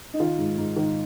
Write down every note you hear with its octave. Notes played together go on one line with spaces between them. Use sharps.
D#4
D#3 F4
G#2
G#2
D#3